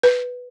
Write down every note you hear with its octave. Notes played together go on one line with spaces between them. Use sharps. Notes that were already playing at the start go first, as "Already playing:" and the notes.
B4